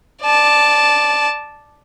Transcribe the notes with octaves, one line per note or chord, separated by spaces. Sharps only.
D5 A5